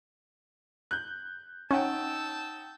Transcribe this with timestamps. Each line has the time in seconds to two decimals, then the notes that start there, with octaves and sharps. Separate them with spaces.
0.91 F#6 G6
1.71 C#4 D#4 F#5 G5 A5 E6 G6